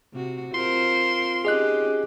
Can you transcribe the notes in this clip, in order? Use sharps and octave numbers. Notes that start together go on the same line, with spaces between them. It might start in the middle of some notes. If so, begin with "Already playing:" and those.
C3 F#4
C4 F4 A#4 C5 C6
C#4 D#4 G4 G#4 D#5 F#6